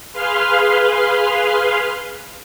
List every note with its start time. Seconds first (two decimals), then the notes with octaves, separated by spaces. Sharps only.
0.12 G#4 B4 F5 C6 F6